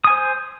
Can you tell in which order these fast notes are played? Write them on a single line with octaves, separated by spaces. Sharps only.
D#6 G#5 C5